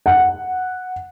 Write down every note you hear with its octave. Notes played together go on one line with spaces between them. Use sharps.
F#5